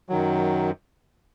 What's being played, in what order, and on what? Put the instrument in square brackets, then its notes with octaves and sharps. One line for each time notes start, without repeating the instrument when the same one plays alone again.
[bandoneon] F#2 D#3 F#3